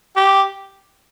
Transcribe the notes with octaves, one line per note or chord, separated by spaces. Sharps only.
G4